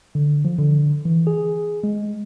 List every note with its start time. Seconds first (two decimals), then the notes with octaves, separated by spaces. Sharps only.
0.15 D3
0.45 F3
0.59 D3
1.05 E3
1.27 G#4
1.84 G#3